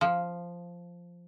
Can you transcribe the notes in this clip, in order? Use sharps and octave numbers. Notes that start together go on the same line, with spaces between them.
F3